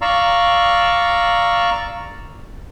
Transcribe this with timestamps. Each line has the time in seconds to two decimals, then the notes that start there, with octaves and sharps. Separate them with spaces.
0.02 D5 F5 A#5 C#6 E6